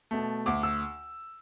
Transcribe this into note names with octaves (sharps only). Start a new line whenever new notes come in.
B2 A3
D2 D6
E6